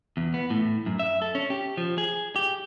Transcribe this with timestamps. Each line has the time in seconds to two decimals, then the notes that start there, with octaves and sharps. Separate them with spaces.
0.17 E2
0.34 B3
0.50 A2
0.86 F#2
0.99 E5
1.22 A4
1.35 C#4
1.50 G4
1.77 F3
1.98 G#4
2.36 G4